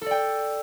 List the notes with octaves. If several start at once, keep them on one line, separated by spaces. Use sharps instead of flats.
A4 D5 G5